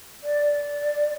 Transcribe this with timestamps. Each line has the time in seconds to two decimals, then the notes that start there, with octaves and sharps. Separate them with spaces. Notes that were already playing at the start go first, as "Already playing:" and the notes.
0.23 D5